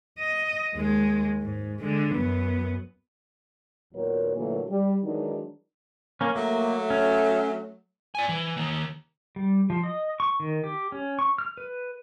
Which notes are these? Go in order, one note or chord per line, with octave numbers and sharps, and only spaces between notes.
D#5
D#2 G#3
G#2
D3 G#3
F#2 B3
D#2 A#2 F#3 B3 A#4 C#5
A#2 D3 E3 F#3 A3 A#3
G3
D#3 E3 F#3 G#3 D4 D#4
A#3 C#4
F#3 A3 A#3
C#4
D5 G#5
E3
D#3 A#3
G3
F3
D#5
C#6
D#3
G4
C#4
C#6
F6
B4